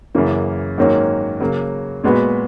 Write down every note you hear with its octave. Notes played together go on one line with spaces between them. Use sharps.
F#2 C#3 E3 A#3
G#2 D#3 F#3 A#3 C#4
C#3 F#3 A#3
A#2 G#3 B3 F#4 B4